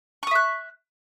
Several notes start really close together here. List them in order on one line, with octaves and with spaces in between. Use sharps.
C#6 D#6 E5 F#6